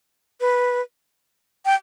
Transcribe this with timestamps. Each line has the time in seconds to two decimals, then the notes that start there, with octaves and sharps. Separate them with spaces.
0.41 B4
1.66 G5